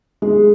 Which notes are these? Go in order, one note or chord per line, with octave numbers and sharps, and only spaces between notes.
G#3